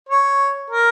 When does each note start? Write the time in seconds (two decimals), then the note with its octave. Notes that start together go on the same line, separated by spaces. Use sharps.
0.09 C#5
0.70 A#4